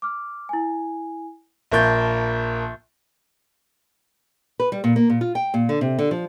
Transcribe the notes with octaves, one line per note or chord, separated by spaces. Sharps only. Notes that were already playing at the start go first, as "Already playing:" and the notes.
D6 F6
E4 G#5
A#1 A#3 E5 C#6 G6 A6
B4
G3
A#2
A#3
A#2
F4
G5
A#2
D3
C3
D3
F3